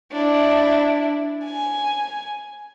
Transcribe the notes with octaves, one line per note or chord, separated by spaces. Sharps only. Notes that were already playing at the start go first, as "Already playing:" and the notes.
D4 E4
G#5